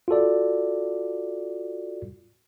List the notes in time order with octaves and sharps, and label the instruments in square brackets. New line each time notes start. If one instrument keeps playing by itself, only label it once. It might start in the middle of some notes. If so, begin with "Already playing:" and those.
[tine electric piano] F4 F#4 A4 D5